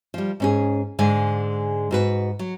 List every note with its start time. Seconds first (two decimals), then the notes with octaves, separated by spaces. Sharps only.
0.14 F3 G3
0.40 G#2 C#4 G#4
0.99 G#2 D3 G#3 G#5
1.91 G#2 F#4 B4
2.39 F#3